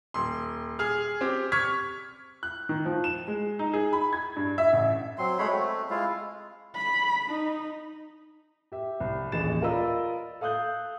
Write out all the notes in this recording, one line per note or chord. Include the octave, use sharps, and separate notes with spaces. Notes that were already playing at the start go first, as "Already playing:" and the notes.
D#1 C6
G#4 F6
C4 G4
C#6 F6 G#6 B6
F#6
D#3
F3
E7
G#3
D#4
G#4
B5
G#6
G2
E5
A1
F#3 C4 C6
G#3 A3 C#5 B5
A3 C4
G#3 E4 F4 F5
B5
D#4
G4 E5
C2
D#1 A1 G#4 D#5 A6 E7
F4 A#4 D5 D#5 B5 E6
A4 F5 D#6 F#6 G6